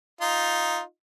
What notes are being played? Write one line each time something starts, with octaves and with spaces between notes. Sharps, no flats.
D#4 F4